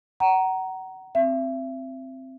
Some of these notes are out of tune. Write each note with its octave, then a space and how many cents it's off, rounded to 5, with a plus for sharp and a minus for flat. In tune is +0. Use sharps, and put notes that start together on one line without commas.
F#5 +30 A#5 +0
C4 +0 E5 +35